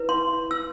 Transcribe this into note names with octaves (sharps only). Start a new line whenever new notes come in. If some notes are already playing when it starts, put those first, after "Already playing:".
Already playing: E4 B4
C6
E6